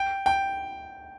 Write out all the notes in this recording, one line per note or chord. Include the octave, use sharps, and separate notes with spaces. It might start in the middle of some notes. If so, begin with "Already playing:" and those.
Already playing: G5
G5